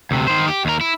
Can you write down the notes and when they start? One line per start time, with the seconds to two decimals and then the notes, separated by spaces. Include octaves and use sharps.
0.11 D2 C3
0.28 D#3 C5
0.48 G4
0.65 D#2 A#4
0.81 E4